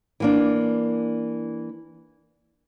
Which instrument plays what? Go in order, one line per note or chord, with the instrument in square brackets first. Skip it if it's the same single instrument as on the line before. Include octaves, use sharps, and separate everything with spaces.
[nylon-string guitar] E3 A#3 D4